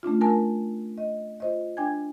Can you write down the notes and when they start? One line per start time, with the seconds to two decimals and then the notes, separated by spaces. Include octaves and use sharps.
0.03 A3 C#4 D4 F4
0.21 A#4 G#5 A5
0.98 D#5
1.40 F4 C5 D#5
1.77 D4 G5 G#5 G#6